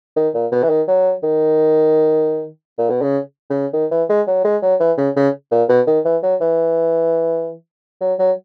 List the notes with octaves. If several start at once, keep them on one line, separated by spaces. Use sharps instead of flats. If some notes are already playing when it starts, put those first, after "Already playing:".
D#3
A#2
B2
E3
D#3
F#3
D#3
A#2
B2
C#3
C#3
D#3
E3
G#3
F#3
G#3
F#3
E3
C#3
C#3
A#2
B2
D#3
E3
F#3
E3
F#3
F#3